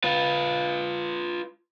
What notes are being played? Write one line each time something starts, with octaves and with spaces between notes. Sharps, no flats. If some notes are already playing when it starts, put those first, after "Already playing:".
F4 B4